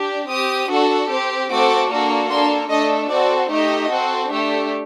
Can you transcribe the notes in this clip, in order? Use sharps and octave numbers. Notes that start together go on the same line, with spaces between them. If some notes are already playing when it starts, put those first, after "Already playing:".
Already playing: D4 G4
C4 G4 D#6
D4 F#4 A4
C4 G4
A3 C4 F#4 A4 D6
A#3 D4 F#4 A4
A#3 D4 A4 C6
A3 D4 A4 D#5
C4 F#4 A4 D5
A3 D#4 G4 D#5
C4 F#4 A4
A3 D4 G4